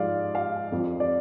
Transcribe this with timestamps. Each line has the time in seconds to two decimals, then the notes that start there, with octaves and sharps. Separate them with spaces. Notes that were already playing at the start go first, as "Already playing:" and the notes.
Already playing: G#2 F3 D5 F5
0.35 F5
0.72 F2 F3
1.00 D5